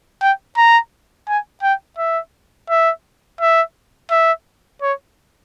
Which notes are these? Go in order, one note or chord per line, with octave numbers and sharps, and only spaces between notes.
G5
A#5
G#5
G5
E5
E5
E5
E5
C#5